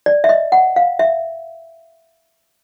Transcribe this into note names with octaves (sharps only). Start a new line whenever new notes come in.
D5
E5
D#5
F#5
F5
E5